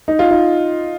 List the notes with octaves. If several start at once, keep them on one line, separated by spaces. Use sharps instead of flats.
D#4
F4
D#4